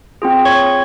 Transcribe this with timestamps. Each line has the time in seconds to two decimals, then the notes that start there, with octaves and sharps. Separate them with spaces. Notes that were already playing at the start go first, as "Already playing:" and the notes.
0.22 C4 F4 G#4
0.45 C#5 C#6